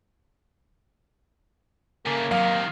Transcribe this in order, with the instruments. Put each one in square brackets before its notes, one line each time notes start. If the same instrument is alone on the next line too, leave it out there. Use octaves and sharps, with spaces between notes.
[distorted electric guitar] C#3 A3 [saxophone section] A#3 [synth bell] G#5 D6
[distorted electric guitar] C3 D#3 [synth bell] F#3 D#7 [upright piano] F5